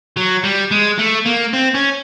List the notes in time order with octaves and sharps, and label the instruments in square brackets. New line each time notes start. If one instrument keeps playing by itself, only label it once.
[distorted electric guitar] F#3
G3
G#3
A3
A#3
C4
C#4